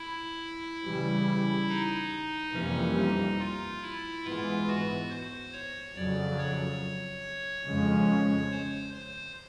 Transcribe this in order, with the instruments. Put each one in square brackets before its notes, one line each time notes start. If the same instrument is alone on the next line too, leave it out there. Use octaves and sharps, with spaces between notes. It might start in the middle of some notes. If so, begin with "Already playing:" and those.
Already playing: [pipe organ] E4
[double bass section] C#3 E3 G3
[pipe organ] D#4
[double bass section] F2 C3 E3 G3 A#3 [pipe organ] C#4
[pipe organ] D#4
F4
E4
[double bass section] G#2 E3 G#3 B3 [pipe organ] F4
[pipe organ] F#4
C5
C#5
[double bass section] F2 C#3 F#3 [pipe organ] D5
[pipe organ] C#5
[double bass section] F2 C#3 F3 G#3 C#4
[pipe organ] C5
C5